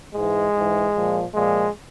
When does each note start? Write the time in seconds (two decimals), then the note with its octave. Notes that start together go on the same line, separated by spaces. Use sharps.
0.15 G#2 E3 G#3
0.55 G#2 E3
0.94 A#2 F3
1.34 A#2 F3 G#3